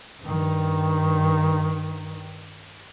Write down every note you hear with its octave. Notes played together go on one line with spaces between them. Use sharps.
G2 D#3